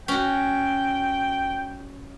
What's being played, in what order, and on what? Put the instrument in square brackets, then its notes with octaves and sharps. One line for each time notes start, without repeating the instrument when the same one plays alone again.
[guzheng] C#4 F#4 [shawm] G5